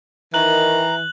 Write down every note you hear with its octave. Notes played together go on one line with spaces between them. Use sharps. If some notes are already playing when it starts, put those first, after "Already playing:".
D#3 E3 A#5 F#6 F#7